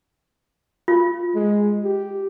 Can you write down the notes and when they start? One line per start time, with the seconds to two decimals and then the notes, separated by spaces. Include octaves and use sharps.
0.88 F4
1.35 G#3
1.84 G4